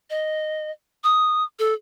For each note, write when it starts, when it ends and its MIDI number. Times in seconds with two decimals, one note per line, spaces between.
0.10 0.71 75
1.04 1.44 87
1.59 1.74 69